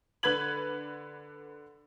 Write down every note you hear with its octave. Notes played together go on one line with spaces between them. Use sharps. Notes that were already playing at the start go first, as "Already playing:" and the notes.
D3 B4 B5 G#6 F#7